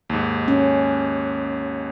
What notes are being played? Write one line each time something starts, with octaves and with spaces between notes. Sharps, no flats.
D#2 G#2
C#4